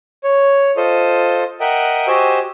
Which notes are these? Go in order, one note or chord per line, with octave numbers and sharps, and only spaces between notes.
C#5
F4 A4 C5 D#5
A#4 D#5 E5 F#5 G5
F#4 G4 C5 D#5 G#5 E6